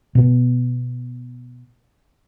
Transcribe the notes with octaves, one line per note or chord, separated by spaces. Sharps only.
B2 B3